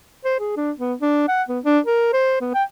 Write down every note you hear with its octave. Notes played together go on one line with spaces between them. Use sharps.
C5
G#4
D4
B3
D4
F#5
B3
D4
A#4
C5
B3
G5